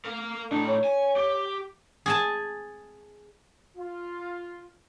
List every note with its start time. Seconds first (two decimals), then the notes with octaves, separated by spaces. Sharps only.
0.05 A#4 F5
0.52 A2 D4 D#4
0.68 C#5
0.84 G#5
1.16 G4
2.06 G#4 G#5 A5
3.77 F4